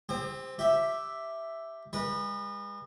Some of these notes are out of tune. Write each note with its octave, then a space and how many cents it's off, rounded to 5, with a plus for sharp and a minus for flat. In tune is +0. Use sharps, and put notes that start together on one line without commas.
C4 +0 G4 +40
G4 +0 E5 +0
G#3 -40 B4 -20